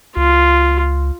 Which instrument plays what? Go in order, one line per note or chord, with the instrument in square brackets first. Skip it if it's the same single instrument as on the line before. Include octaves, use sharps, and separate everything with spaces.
[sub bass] C#2 [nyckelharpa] F4